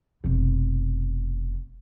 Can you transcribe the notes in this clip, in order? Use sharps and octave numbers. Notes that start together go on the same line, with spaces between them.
F1 B2